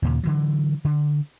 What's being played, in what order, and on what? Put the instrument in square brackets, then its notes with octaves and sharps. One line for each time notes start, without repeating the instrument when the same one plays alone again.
[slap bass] D#2 A#2 C#3
D3 E3 F#3
D3